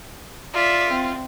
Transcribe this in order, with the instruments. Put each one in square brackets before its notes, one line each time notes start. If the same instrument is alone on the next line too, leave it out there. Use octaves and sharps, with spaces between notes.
[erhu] F4 [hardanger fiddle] D5 E5
[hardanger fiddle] C4